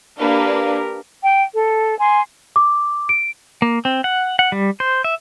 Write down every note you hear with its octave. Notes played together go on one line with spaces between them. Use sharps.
A#3 D4 G4 A#4 B4
G5
A4
G#5 C6
D6
D7
A#3
C4
F#5
F#5
G3
C5
E5